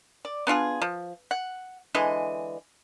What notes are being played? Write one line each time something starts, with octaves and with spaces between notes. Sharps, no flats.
D5
B3 D4 F4 G#4
F3
F#5
D3 E3 G#3 D#5